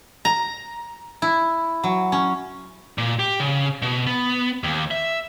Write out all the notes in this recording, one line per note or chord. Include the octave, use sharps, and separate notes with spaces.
A#5
E4
F#3
C#4
A#2
G4
C#3
B2
B3
D#2
E5